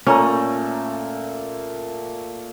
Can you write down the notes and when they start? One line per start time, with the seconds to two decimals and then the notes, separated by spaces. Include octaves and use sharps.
0.07 A#2 A3 C#4 A#5